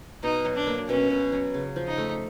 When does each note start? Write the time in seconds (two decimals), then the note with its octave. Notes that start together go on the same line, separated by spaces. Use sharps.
0.23 B2 D#4
0.45 F#3
0.55 D4
0.67 A#3
0.89 B2 C#4
1.10 B2
1.32 F#3
1.54 C#3
1.76 F3
1.87 D#4
1.98 A3